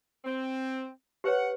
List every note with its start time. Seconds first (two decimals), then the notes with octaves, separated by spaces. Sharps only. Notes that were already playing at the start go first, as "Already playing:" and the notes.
0.24 C4
1.24 G4 B4 C#5 F#5